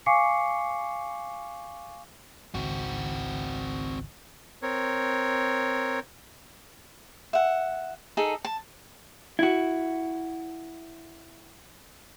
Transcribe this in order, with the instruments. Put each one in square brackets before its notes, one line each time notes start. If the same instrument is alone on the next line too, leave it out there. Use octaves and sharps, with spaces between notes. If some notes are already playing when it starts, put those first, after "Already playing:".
[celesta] F5 G#5 C#6 D6 C7 C#7
[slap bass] G#1 C#2 [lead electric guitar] C4 F#4
[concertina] C4 A#4 C#5
[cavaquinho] E5 F#5
D#4 G#4 A4
A5
[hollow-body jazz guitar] E4 F#4